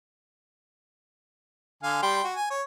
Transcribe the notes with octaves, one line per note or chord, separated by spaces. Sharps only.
D3 F5 G#5
G3 G5 C6
F#4
G#5
C#5